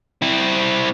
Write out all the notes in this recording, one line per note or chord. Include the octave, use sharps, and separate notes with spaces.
C4 E4